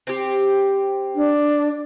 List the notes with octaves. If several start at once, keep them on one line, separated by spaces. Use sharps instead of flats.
C4 G4
D4